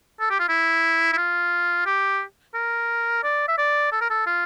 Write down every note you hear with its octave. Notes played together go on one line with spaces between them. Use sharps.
A4
G4
F4
E4
E4
F4
G4
A#4
D5
E5
D5
A4
A#4
A4
F4